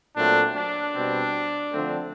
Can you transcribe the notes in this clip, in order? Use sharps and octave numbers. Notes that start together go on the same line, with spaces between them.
A#2 F#3 A3 C4 D4
D4
B2 G3 C4
D3 F3 A3 C4